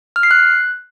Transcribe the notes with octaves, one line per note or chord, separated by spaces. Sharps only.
F6
C7
F#6